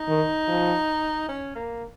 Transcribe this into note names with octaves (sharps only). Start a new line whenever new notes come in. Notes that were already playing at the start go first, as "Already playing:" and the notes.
Already playing: D#4
D#3
F3
C#4
A#3